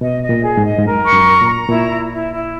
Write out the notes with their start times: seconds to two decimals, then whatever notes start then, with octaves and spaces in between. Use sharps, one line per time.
0.01 B2 D#5
0.22 D#5
0.29 A#2
0.43 G#4
0.57 G#2
0.63 D#5
0.78 G#2
0.85 F#2 A#4
1.06 C#6
1.12 F#2
1.26 A#5
1.41 A#2
1.47 A#5
1.68 A#2 E4
1.89 E4
2.10 E4
2.32 E4